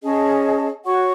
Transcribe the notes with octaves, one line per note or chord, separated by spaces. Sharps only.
C#4 G#4 D#5 A5
F#4 C#5 F#5 C#6